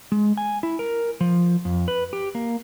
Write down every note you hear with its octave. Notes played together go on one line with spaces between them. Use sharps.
G#3
G#5
E4
A#4
F3
F2
B4
G4
A#3